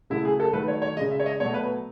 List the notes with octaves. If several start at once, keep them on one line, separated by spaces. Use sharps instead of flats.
C#3 F#3 A3 E4
G#4
A4
D#3 F#3 A3 B4
C#5
C#5
C#3 G#3 D#5
E5
C#5
D#5
B2 F#3 A3 C#5
B4